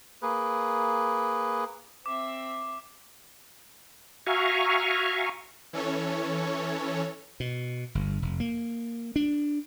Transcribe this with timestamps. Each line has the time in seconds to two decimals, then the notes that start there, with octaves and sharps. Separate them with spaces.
0.22 A#3 G#4 B4
2.06 C4 E5 D6
4.27 F#4 E5 F5 G#5 A#5 C#6
5.73 E3 C#4 A4 C#5
7.40 B2
7.95 G1
8.22 F1
8.40 A#3
9.16 D4